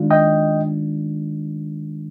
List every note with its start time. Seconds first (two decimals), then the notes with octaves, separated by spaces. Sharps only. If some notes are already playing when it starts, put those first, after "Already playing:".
Already playing: D#3 G#3 D4 F4
0.11 D#5 G5